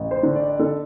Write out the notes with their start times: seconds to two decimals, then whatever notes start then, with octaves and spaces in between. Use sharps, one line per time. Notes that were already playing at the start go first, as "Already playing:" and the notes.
Already playing: A1
0.11 C5
0.23 D3
0.35 D5
0.59 D3 A4